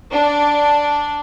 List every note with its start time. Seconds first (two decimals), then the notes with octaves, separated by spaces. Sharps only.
0.11 D4